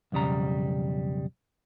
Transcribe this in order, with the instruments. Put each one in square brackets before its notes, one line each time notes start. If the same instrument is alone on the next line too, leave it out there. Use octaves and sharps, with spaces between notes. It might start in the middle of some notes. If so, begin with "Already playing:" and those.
[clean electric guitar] B1 F2 C#3 G3 A#5